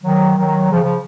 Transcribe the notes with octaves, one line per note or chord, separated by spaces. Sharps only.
D#3 F#3
D#3 F#3
C#3 F3
C#3 F3